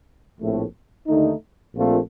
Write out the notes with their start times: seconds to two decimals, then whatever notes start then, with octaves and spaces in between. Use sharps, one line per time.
0.40 A#1 A2 A3 C4
1.08 D#2 D3 A3 D#4
1.75 A#1 A#2 A3 C4 F4